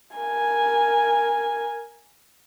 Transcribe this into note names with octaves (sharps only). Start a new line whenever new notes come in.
A#4 G#5